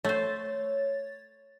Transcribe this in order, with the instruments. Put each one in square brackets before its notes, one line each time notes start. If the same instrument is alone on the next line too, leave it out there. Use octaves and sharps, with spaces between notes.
[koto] A3 C5 [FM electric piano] C#5 A6